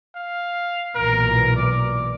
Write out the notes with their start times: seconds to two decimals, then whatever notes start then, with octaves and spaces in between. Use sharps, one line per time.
0.15 F5
0.95 B1 A#2 E3 A#4
1.56 D5